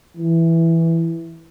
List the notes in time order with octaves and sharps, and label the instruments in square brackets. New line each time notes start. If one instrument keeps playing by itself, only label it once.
[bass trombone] E3